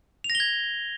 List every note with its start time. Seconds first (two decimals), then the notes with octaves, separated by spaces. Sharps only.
0.24 F7
0.30 A#6
0.35 G7
0.40 G#6